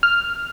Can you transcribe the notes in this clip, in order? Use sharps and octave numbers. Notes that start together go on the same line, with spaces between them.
F6